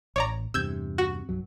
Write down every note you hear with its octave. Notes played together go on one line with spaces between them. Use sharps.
A1 C#5 D5 A#5
E2 G2 C3 E6 G6 G#6
F#4
B1 F#2 F#3